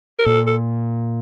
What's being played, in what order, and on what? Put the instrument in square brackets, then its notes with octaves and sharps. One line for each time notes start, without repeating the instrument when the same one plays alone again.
[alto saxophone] A#4
[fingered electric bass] A#2 [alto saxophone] A4
[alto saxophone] A4